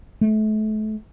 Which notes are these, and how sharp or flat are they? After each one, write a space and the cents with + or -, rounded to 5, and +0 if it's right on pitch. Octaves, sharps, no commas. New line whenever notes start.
A3 -35